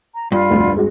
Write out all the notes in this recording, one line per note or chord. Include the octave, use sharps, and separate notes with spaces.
A#5
G2 F4 D5 B5
F1 D2
G#3 F#4